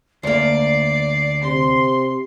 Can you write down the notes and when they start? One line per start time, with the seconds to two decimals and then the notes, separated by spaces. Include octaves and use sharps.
0.23 D2 A#3 D5 C7
1.43 C3 C6